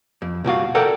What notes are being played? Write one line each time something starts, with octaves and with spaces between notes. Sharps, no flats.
F2
C2 A#2 F#4 F5
A4 A#4 D5 F#5 G5